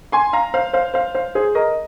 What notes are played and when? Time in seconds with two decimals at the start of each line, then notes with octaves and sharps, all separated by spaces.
0.12 G#5 C6
0.33 F5 A#5
0.54 C5 F5
0.73 C5 F5
0.94 C5 F5
1.14 C5 F5
1.35 G#4 C5
1.55 A#4 D#5